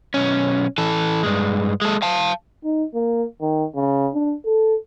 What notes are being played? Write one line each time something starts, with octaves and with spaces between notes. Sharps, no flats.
B1 C#4
E3 A4
G2 G#3
G#3 A4
F5 A5
D#4
A#3
D#3
C#3
D4
A4